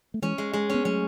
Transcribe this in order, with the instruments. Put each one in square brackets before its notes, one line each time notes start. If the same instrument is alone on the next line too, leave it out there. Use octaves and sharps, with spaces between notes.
[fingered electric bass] A3
[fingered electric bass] E3 G#3 [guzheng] C#4
[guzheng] G#3
G#3
[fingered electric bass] B3 [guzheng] C#4
[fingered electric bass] F#3 A3 [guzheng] C#4